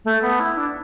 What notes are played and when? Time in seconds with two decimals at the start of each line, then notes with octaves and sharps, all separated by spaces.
0.05 A3
0.23 B3
0.40 E4
0.57 D4